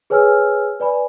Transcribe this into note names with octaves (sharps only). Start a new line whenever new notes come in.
G#4 B4 C#5 G#5 E6 F6
B4 D5 G#5 B5